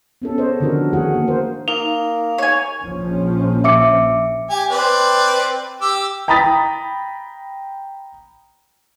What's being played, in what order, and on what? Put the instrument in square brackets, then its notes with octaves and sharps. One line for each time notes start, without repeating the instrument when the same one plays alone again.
[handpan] B3 C#4 A4
G#4 C5 C#5 D#5
D3 D#3 F3 D4 F#4 A#4
D#3 A3 D4 F#4 G#4 F#5
A#3
A#4 C5
[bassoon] A#3 [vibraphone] D#4 [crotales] F7
[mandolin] C#5 G#5
[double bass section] A#1 F3 C#4
[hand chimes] E5 D6 C#7
[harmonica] G4 G#5
C4 B4 D5
G4 D6 E6
[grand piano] G5 A#5 B5 D#6 A6 B6